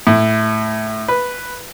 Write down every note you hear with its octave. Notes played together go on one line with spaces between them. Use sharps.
A2
B4